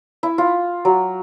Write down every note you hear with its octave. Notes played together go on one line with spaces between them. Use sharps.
E4
F4
F#3